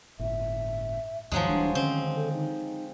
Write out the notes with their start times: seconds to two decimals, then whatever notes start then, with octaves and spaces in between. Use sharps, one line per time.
0.19 G1 A2 E5
1.32 D#2 G#2 D#3 F3 F#3 G#3
1.48 D#1 E3 G3 D4
1.75 D3 D#3 C4 C#4
2.16 A4
2.33 D#4